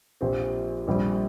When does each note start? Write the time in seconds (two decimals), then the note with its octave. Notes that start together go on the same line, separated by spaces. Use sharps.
0.21 A#1 A#2 F3 C4 G4
0.87 A#1 A#2 G3 C4